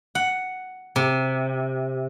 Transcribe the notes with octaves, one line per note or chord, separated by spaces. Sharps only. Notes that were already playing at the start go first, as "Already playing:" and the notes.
F#5
C3